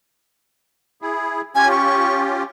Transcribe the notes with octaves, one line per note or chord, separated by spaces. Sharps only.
E4 G#4
C#4 F4 G4 G#5
C#6